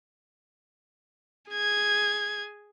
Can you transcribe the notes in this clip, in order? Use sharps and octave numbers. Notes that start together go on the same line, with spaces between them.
G#4 G#6